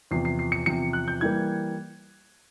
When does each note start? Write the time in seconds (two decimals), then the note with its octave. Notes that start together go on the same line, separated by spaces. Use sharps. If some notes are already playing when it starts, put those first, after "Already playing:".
0.11 E2 C3 F3 C7
0.25 C7
0.39 C7
0.52 C#7
0.66 E2 C3 F3 C#7
0.93 F#6
1.08 G6
1.21 E3 G3 A#3 G#6